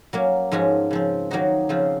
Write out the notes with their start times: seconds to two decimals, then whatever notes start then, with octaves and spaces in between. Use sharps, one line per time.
0.13 F#3 A#3 C#4
0.52 G#2 F3 G#3 C#4 F#4
0.91 C#3 F3 C4
1.31 D#3 F#3 A#3 D#4 F#4
1.69 C#3 F3 C4 F4 C5